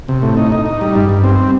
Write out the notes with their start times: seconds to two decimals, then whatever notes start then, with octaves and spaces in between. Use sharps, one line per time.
0.08 C3
0.22 A2
0.37 D#4
0.52 D#4
0.66 D#4
0.81 G3
0.96 G2
1.09 G2
1.24 C4